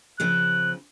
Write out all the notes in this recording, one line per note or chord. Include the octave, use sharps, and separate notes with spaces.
C#3 F3 C4 F#6